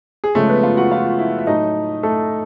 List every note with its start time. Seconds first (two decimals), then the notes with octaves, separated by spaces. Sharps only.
0.24 G#4
0.35 C#3 F3 G#3 A3 A4
0.49 B3 B4
0.63 F4 F5
0.77 F#4 F#5
0.91 F4 F5
1.19 E4 E5
1.39 E5
1.47 A2 F#3 A3 D#4 D#5
2.03 A3 A4